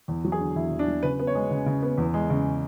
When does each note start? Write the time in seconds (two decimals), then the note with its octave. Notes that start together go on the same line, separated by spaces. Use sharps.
0.08 E2
0.25 F#3
0.32 G#4
0.40 D3
0.55 E2 E4
0.72 E2
0.79 D4
0.88 F#3
1.03 C#3 B4
1.19 B3
1.27 C#5
1.35 G#3
1.51 C#3
1.66 C#3
1.82 B3
1.98 E2
2.14 G#3
2.30 C#3